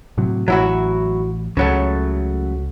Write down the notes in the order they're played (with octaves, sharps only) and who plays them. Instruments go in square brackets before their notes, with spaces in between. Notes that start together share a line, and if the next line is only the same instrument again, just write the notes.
[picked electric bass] A2 C3 F#3
[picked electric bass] A1 [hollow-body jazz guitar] F#3 E4 F#4
[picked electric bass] C#2 [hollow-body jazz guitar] C#3 F#3 A3